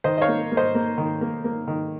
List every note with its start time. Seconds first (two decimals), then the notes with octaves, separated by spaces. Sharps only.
0.04 D#3 C5 D#5
0.18 D#5
0.22 C#5 F5
0.28 A#3
0.51 A#3
0.57 C5 D#5
0.75 A#3
0.98 D#3
1.21 A#3
1.44 A#3
1.68 D#3